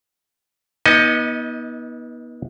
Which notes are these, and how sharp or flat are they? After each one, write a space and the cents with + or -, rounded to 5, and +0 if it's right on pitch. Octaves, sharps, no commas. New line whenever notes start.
B3 -35 D#4 +30 D#5 +0